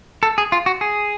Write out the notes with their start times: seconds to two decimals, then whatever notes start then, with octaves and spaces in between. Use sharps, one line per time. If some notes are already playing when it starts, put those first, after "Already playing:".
0.23 A4
0.38 G#4
0.52 F4
0.66 F#4
0.81 G#4